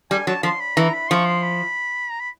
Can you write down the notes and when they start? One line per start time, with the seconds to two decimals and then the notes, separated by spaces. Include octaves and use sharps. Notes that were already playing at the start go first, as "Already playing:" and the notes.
0.11 G3 G#5
0.27 F#3 A5
0.43 F3 C6
0.60 B5
0.76 E3 A#5
0.94 B5
1.10 F3 C#6
1.27 C6
1.43 B5
2.11 A#5
2.20 B5